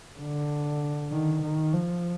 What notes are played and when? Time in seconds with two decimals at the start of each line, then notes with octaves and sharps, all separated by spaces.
0.20 D3
1.11 D#3
1.42 D#3
1.74 F3